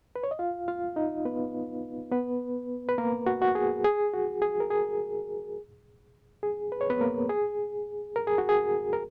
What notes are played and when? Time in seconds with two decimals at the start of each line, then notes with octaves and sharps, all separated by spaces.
0.16 B4
0.23 C#5
0.31 D#5
0.39 F4 F5
0.68 F4 F5
0.96 D#4 D#5
1.25 B3 B4
2.11 B3 B4
2.89 B4
2.98 A#3 A#4
3.26 F#4
3.42 F#4
3.55 G#4
3.84 G#4
4.14 F#4
4.42 G#4
4.60 A#4
4.70 G#4
6.43 G#4
6.72 B4
6.81 C#5
6.90 B3 B4
7.01 A#3 A#4
7.29 G#4
8.16 A#4
8.27 G#4
8.38 F#4
8.49 G#4
8.93 A#4